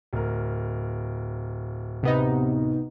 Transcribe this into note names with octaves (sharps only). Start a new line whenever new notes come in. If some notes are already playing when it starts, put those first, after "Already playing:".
D1 A#4
C3 B3 D#4